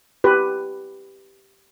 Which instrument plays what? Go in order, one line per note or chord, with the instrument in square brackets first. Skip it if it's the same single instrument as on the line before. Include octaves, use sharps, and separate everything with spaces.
[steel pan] G4 B4